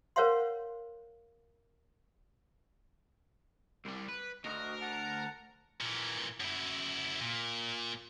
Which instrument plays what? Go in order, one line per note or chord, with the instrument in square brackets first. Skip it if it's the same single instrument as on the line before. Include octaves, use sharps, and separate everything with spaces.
[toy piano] A#4 C5 C#5 F5 F#5 C6
[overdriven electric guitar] C2 G3
B4
[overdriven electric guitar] D2 [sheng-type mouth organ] F#4 D#5 [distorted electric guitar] A#4
[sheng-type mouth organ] F#5 A5
[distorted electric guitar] A#2 E3
F#2 E4
A#2